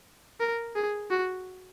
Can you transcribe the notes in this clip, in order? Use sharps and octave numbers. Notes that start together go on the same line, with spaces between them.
A#4
G#4
F#4